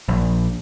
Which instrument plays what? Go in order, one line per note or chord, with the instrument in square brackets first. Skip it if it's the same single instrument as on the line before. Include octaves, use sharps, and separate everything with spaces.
[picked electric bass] A#1